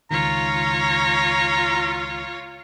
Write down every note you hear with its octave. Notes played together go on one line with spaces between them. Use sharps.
C#2 D#3 F4 C#5 A#5